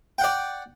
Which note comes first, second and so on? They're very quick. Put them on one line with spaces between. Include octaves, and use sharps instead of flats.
G5 F#5 D5